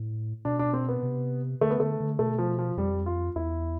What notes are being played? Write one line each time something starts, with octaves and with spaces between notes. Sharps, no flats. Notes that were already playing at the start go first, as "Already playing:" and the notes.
Already playing: A2
B2 D4
D4
C4
B3
C3
D3 A3
B3
D3 A3
D3
B2 A3
F3
F3
F2 G3
F4
E2 E4